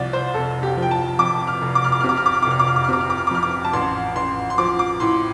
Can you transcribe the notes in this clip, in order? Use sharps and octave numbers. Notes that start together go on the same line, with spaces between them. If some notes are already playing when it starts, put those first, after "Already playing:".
Already playing: C2 F3 D5
C5
F1 A4
G4
F3
G5
A5
F2 D6
F6
F1
D6
F6
D6
C3 F6
D6
F6
D6
F6
F1 D6
F6
D6
F6
D6
F6
C3 D6
F6
D6
F6
D6
F2 F6
D6
A5
A1 C6
A1 C6
C6
F3 D6
D6
A2 C6